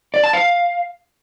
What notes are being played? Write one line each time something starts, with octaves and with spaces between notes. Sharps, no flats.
D5
A5
F5